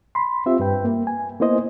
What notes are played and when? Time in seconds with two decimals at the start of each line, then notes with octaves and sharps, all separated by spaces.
0.15 B5 C6
0.46 C4 F4 G4 E5
0.60 G2 B4 G5
0.85 A#3
1.07 G#5
1.40 A#3 B3 E4 C5 D#5